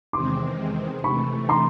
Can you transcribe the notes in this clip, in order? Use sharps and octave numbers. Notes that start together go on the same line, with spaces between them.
E2 C3 D#3 G#3 C4 C6 D6
C3 E3 A3 B5 C#6
A#5 C6